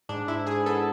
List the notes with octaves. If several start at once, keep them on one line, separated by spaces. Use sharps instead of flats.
G#2 D4
G#2 E4
G#2 G#4
B3 A4